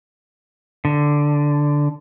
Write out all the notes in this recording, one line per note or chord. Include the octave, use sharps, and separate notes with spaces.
D3